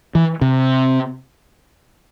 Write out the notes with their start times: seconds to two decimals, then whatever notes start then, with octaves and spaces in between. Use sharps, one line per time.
0.15 E3
0.41 C3